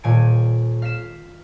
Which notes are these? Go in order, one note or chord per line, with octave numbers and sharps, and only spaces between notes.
D#1 A#2 G#5 D7
F5 B6 E7